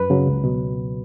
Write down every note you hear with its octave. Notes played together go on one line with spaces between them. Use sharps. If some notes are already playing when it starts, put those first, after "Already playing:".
Already playing: F#2 B4
C#3 F#3
C#2
B2 F#3